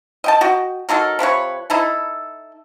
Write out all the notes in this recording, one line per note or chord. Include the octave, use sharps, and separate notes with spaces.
D#5 G5 A5
F#4 D#5 G5
F#3 D#4 A4 A#4
C3 F3 B4 C#5
D#4 E4 A4